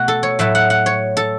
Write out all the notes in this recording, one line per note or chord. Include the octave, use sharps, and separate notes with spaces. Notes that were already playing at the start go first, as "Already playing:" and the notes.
Already playing: B2 A3 F#4
A4
C#5
A2 F#3 A3 E5
F#5
F#5
C#5
A4